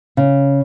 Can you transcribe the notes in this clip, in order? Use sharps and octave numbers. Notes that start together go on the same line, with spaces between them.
C#3